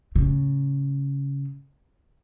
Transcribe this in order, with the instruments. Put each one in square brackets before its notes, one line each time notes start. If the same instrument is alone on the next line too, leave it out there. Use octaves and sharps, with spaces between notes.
[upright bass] A2 C#3